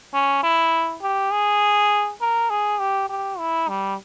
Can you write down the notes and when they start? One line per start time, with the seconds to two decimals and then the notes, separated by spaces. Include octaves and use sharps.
0.13 C#4
0.43 E4
1.02 G4
1.32 G#4
2.21 A#4
2.50 G#4
2.79 G4
3.09 G4
3.39 E4
3.68 G3